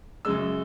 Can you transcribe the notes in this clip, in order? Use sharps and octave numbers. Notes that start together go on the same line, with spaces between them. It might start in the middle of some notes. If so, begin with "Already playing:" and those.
F#2 C#3 G#3 E6